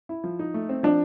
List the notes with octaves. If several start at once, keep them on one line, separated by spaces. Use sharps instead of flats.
E4
F3
D#4
A3
C4
F3 D4